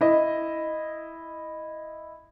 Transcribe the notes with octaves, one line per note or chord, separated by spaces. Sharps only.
E4 D#5